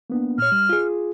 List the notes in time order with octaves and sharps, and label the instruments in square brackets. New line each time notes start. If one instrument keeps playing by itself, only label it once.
[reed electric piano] A#3 B3 D4
[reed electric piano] A#2 C#5 [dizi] F6
[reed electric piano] G3
F4 G#4